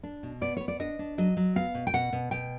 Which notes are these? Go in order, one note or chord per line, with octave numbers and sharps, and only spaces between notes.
D4
B2
B3 D5
B3 C#5
D5
D4 D#5
D4
F#3 D#5
F#3
B3 F5
B2
G5
B2 F#5
B2
B2 G5